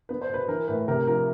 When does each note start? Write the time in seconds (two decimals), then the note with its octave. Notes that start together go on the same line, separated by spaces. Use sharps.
0.09 B3 B4
0.22 C5
0.29 B2 B4
0.48 E3 A#4
0.68 A2 B4
0.88 C3 A#4
1.07 F3 A#4